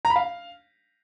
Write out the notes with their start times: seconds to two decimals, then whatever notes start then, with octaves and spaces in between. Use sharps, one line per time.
0.05 A#5
0.10 B5
0.16 F5